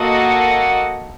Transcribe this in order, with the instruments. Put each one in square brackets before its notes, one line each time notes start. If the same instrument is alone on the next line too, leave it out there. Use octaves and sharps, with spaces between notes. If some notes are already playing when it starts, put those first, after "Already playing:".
Already playing: [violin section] A#3 F#4 A4 D#5 F#5